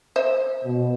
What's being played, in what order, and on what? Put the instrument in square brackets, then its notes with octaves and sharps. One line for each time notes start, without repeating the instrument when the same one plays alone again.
[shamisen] C5 E5
[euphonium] B2